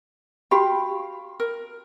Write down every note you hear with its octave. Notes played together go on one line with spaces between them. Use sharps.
F#4 G4 F5 G5 B5
A#4